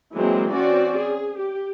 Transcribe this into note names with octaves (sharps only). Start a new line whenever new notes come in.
E3 F#3 G#3 A#3 C4
C4 C#4 F#4 D5
G#4
G4